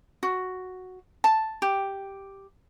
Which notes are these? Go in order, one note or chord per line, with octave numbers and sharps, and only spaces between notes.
F#4
A5
G4